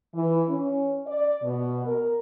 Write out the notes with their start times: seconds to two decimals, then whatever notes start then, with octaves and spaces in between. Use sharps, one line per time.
0.14 E3
0.49 C#4
1.06 D5
1.43 B2
1.85 A#4